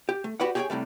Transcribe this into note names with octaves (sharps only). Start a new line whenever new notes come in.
G4
A3
F#4 G4 B4 D5 F#5
G4 G#4 C#5 D5 G5 G#5
A2 C3 G3 A3